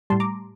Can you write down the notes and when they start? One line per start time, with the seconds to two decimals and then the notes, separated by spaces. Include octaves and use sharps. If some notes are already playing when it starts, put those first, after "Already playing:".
0.10 A2 G3 A5 C6
0.20 A#5 D6